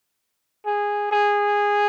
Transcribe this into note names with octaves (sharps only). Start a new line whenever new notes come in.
G#4
G#4